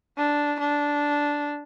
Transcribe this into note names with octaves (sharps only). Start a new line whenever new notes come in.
D4
D4